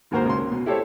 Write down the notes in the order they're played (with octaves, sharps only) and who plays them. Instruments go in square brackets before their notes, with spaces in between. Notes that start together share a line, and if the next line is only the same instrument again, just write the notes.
[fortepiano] D#2 G#2 A#3 F#4 A#4 C5
C#2 C6
A#3
B2
E4 G4 A4 C5 C#5